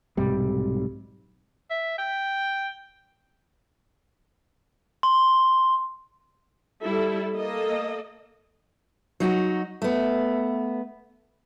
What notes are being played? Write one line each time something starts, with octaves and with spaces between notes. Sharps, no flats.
B1 G#2 C3 G3
E5
G5
C6
G3 E4 A4
A#3 A4 D#5
F#3 D#4 F#4
A3 B3